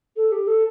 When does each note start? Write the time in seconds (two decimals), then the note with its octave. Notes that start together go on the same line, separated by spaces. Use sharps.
0.16 A4
0.31 G4
0.47 A4